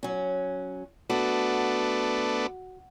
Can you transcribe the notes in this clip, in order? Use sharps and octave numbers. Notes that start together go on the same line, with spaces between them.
F#3 C#4
A3 B3 D4 F#4